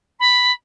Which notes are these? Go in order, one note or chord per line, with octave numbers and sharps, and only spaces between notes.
B5